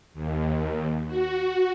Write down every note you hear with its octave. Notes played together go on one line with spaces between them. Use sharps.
D#2
F#4